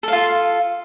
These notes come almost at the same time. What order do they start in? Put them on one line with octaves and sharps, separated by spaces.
A4 F5 F4